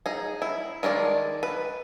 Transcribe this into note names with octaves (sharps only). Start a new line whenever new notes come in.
D#4 G#4
E4
D#3 G#3 D4 D5
B4